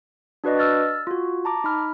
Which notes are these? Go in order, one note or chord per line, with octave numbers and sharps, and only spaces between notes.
D4 F#4 B4 D5 D#5
E6 F6 A6
F4 F#4
A5 A#5 D6
D#4 B5 F6